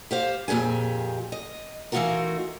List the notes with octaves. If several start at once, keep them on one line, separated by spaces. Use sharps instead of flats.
G4 C5 F5
F2 A#2 G4 G#4 G#5
D#5
E3 A3 D#4 F4 F#4 A#4